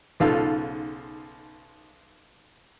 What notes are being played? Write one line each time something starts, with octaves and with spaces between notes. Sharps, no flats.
B1 G#2 C#3 F4 A4